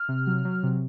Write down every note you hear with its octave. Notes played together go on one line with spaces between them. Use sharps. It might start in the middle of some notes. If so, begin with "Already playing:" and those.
Already playing: F6
C3
F#3
F#3
C3